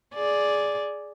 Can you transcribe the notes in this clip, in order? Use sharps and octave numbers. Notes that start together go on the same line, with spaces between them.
G#4 D5